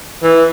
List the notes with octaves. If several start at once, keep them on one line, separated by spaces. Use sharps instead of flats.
E3